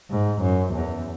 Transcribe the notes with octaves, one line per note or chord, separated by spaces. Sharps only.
G#2
F#2
E2